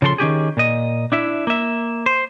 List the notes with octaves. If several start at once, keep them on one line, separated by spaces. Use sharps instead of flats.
C#3 F3 A4 A#4 C6
D#3 C#4 G4 G#4
A#2 D#5
D4 E4 E5
A#3 E5
C5